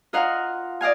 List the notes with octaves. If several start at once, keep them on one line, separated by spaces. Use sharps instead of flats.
F4 A#4 D#5 F5 F#5
D5 D#5 F5 G#5